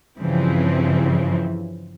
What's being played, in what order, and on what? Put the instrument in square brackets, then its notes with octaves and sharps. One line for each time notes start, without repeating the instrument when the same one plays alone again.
[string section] G2 C#3 E3 F3 C4